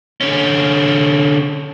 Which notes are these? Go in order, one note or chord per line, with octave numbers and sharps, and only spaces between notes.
D3 C#4